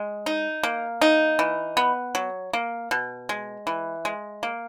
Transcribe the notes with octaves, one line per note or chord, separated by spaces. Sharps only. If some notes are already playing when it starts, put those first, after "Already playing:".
Already playing: G#3
D#4
A#3
D#4
E3
B3
F#3
A#3
B2
G#3
E3
G#3
A#3